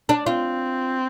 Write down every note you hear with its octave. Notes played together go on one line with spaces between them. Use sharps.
D4
C4 F4